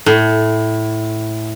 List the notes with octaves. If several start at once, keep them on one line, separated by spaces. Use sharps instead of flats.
A2